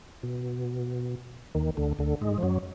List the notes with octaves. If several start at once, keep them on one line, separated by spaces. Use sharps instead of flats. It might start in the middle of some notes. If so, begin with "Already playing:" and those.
B2
D#2 D#3
D2 D3
D2 D3
G#2 G#3
F3
F#2 F#3